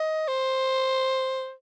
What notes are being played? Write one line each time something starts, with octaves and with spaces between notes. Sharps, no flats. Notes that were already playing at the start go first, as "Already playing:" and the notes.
Already playing: D#5
C5